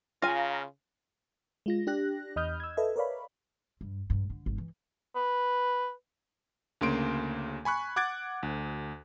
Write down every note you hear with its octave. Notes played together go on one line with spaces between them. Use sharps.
C#3 F4 F5 G#5 A#5
G#3 F4 A#6
D4 G4 F#6 A#6
E2 D#5 B5 D#6 F6 G6
E6 G#6
A4 B4 D#5 E5
A#4 B4 C#5 D5 F5 B5
G2
G2
D3
G#1
E3
B4
D2 C#3 A#3 C6 D7
G#5 B5 C#6 F#6
F#5 D6 F#6 G#6 A6 D7
D2